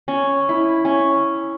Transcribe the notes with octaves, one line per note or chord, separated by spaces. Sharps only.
C#4
E4
C#4